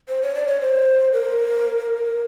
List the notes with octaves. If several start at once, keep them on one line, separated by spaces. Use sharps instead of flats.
C5
C#5
D5
C#5
C5
A#4